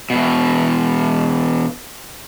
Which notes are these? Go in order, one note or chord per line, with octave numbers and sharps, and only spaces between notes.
E2 B2